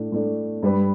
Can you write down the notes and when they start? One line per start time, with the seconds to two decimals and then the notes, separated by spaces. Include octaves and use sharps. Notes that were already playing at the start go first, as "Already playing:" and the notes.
Already playing: A2 A3 D4
0.12 A2 A3 D4
0.62 G2 G3 D4 B4